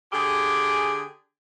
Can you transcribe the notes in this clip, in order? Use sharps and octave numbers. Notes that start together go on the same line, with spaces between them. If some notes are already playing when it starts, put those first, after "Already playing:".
D3 G4 G#4